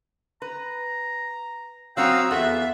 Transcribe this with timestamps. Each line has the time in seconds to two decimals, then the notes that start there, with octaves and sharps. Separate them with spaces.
0.42 B4 A#5
1.97 F#3 C4 F#4 F5 G5 A#5 D#6 E6
2.31 E2 F4 F#4 A4 E5